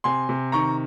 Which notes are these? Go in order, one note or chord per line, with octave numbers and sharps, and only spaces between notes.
C3 G#5 C6
C3
D#3 A#5 C#6